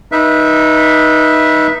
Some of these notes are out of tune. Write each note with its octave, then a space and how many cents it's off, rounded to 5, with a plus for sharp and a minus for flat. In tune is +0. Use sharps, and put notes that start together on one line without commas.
D#4 +0 B4 -30 E5 +0